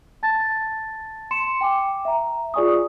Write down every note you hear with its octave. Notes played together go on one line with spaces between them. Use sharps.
A5 A6
C6 C#7 E7
G5 G#5 D6
E5 A#5
F4 G#4 D5 G#5 C#6 D#6